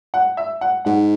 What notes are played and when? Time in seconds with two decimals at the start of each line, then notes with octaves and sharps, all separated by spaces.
0.14 F#5
0.37 E5
0.61 F#5
0.85 G#2 F#5